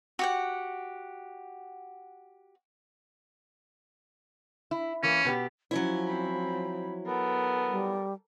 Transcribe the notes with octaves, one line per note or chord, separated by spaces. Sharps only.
F#4 G4 F#5
E4
E3 A#3 C#4
B2 B3 G4
F3 F#3 C#4 E4
C4 B5
B3 A4 A#4
G3